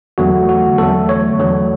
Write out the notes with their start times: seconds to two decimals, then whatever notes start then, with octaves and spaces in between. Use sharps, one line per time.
0.18 E2 D3 F#3 A3 F#4
0.49 F#4
0.78 E2 D3 F#3 A3 A4
1.09 C#5
1.39 E2 D3 F#3 A3